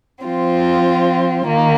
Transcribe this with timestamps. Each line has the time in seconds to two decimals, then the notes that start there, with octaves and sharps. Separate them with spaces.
0.23 F3 C4 F4
1.47 D#3 A#3